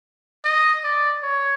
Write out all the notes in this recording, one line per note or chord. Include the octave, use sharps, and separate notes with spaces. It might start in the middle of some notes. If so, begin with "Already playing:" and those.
D#5
D5
C#5